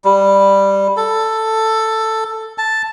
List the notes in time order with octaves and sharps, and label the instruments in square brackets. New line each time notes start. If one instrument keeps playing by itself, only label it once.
[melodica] G3
A4
A5